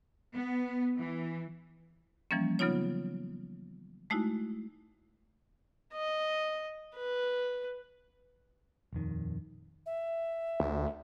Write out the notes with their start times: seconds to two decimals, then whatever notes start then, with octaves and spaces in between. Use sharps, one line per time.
0.34 B3
0.98 E3
2.31 E3 F3 G3 A#3 C#4
2.59 C#3 F#3 B3 D#4 F4 C#5
4.10 G#3 A3 D#4 E4 F#4
5.93 D#5
6.96 B4
8.93 D#1 F2 D#3
9.86 E5
10.60 D2